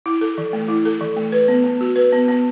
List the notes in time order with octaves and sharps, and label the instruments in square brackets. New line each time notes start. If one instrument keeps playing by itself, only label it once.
[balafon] E4
A4
E3
A3
E4
A4
E3
A3
B4
B3
B3
F#4
B4
B3
B3